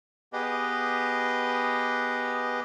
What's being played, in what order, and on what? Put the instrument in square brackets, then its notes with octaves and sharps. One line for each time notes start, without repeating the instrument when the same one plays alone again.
[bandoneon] B3 G4 G#4 B4 D#5